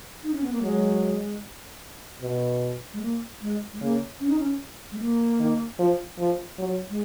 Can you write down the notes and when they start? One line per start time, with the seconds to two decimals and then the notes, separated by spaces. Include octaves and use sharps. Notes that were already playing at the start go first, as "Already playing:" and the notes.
0.23 D#4
0.33 C#4
0.43 B3
0.53 A#3
0.63 F#3 G#3
2.22 B2
2.93 G#3
3.01 A#3
3.41 G#3
3.73 G#3
3.81 C#3 A#3
4.20 C#4
4.29 D#4
4.39 C#4
4.92 G#3
5.00 A#3
5.40 D#3
5.79 F3
6.19 F3
6.59 F#3
6.89 G#3